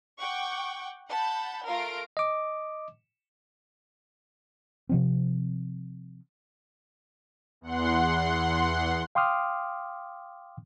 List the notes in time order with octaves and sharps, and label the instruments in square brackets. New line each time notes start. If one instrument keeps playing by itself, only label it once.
[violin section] F#5 G5 C#6 D6
F#5 A5 B5 G6
A3 F4 A#4 F5 A#6 D7
[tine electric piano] D#5 D6
[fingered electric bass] C3 F3 C4
[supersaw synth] E2 F#5 C6
[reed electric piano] F5 G5 C6 D6 D#6 F6